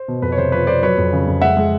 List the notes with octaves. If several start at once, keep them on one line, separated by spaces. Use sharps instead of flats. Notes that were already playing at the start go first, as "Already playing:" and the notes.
Already playing: C5
B2
F2 B4
C#5
C3 C5
F3 B4 C#5
F3 C5 D5
F#3 B4 C#5
F2
C#3
F2
G#3 E5 F#5
G#3